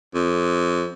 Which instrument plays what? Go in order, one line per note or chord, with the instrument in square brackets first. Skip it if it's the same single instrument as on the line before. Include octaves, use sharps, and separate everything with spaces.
[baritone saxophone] F2